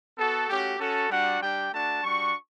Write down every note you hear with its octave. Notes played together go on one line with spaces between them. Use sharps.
B3 F#4 A4
A3 C#4 F#4 G4
C#4 F#4 A4
G3 D4 F#4 F#5
G3 D4 G4 G5
A3 D4 F#4 A5
G3 D4 F#4 C#6